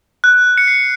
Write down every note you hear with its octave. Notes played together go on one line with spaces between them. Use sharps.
F#6
C#7
C7